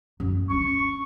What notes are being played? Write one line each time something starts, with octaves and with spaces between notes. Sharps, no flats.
F#2
C#4 D4 C#6